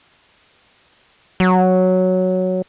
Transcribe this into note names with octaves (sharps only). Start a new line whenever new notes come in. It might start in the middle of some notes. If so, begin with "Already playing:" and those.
F#3